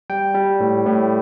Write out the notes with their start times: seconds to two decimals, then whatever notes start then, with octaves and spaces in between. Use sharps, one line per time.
0.10 G3 G5
0.35 G3
0.60 A2
0.86 A2